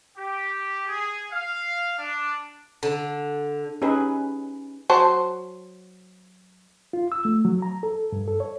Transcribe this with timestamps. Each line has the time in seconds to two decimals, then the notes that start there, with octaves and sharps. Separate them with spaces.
0.17 G4
0.87 G#4
1.31 F5
1.99 D4
2.83 D3
3.82 C#4 D#4 G4 G#4 B4
4.90 F#3 C5 A5
6.93 F4
7.12 E6
7.25 A3
7.45 F#3
7.62 A#5
7.83 A4
8.12 G2
8.28 A4
8.40 C#5